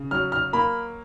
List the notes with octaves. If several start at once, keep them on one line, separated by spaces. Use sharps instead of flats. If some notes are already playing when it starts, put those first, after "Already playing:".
Already playing: C#3
F#3 F6
F6
A#3 B5